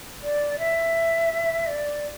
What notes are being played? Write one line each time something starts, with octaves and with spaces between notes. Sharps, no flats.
D5
E5
D5